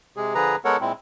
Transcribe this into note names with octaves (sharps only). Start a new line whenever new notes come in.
C3 G#3 G#4
D3 F3 G#4 B4 A#5
G#3 B3 A4 A#4 C#5 F#5
A#2 G#3 C4 E4